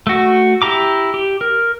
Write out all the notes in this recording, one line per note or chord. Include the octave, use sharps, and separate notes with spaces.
A3 F#4
E4 G4 A#5 D6
G4
A#4